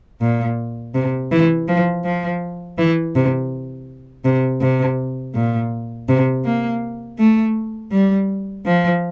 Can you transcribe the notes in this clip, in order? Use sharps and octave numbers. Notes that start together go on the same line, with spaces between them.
A#2
C3
E3
F3
F3
E3
C3
C3
C3
A#2
C3
A#3
A3
G3
F3